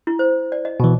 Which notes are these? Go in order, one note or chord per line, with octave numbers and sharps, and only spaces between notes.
E4
C5
D5
D#5
B2 E3